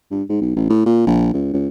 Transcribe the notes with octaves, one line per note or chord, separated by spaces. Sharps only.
G2
G#2
B1
A1
A2
A#2
A#1
C#2
C#2